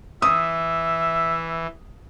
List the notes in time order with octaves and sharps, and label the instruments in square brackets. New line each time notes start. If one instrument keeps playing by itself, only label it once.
[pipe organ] E3 [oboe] E5 [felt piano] D#6